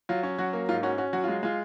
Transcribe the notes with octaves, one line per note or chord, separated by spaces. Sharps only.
F#3 F4
C#4
F#3 F#4
A#3
G#2 F4
C#4 F#4
C#4 F#4
F#3 F#4
G#3 F4
G#3 F4